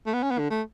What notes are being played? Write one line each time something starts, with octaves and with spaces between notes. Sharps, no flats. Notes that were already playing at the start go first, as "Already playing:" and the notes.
A3
B3
C#4
B3
D3
A3